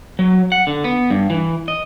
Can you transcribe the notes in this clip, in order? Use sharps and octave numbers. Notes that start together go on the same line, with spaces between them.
F#3
F#5
D3
B3
G2
E3
D#5